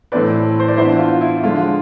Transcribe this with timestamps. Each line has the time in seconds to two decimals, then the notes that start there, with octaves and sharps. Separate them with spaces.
0.12 A2 E3 A3 C4 B4 D5
0.60 C5
0.68 D5
0.77 E3 B3 D4 C5 E5
0.99 F4
1.21 E4
1.43 D3 F3 G#3 D4 F4